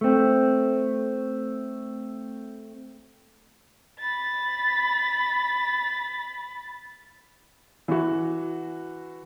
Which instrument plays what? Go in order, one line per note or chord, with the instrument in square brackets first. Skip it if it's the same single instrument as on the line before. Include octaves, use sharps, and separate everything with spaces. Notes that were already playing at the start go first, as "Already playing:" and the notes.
[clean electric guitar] A3 C4
[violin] B5 A6
[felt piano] E3 F#4